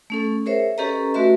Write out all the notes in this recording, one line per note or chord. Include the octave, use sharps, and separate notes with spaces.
A3 C#4 A4
G#4 A#4 C5 C#5 E5
C#4 G4 A4 B4 D#5 A#5
A3 F#4 B4 E5 C6